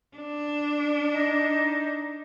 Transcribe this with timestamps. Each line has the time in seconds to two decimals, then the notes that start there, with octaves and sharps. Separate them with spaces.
0.17 D4
1.12 D#4